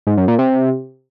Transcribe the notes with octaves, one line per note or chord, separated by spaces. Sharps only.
G#2
F#2
A#2
C3